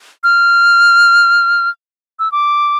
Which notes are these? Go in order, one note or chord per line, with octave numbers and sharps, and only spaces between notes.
F6
E6
D6